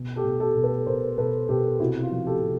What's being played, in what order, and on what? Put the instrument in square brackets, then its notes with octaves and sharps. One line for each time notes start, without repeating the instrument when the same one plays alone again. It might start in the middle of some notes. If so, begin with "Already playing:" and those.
Already playing: [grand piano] B2
G4 A4
B2
G4 A4
B2
A4 B4
B2 A#4 C5
B2 A4 B4
B2 G4 A4
C3 E4 F#4
F4
F3
G4 A4
C3